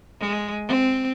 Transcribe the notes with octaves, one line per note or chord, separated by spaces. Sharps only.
G#3
C4